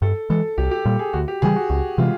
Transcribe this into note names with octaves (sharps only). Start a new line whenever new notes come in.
G2 A4
E3 G#3 A4
C2 G4
G4
A#2 G3
G#4
D2 F#4
G4
C#3 E3 G3 G#4
F#4
C#2 F#4
C3 E3 G#3 F4